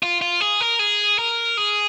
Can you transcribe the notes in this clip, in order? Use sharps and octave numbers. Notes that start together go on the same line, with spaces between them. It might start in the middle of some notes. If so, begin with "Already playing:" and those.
F4
F4
G#4
A#4
G#4
A#4
G#4